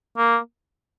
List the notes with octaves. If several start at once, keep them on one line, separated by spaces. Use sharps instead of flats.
A#3